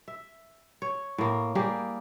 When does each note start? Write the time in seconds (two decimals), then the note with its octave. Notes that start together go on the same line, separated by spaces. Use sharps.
0.08 E5
0.82 C#5
1.18 A2 A#3
1.55 G3 A#3 G4 G#4